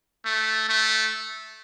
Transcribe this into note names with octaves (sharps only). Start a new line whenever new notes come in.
A3
A3